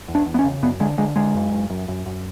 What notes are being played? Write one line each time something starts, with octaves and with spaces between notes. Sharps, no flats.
E2
D4
E2
B3
C#4
C#3
F#2 B3
D3 G#3
D3 G#3
D3 G#3
F#2
F#2
F#2
F#2
F#2